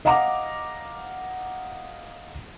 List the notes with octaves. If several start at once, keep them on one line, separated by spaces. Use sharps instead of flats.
D#5 F5 F#5 A#5 D6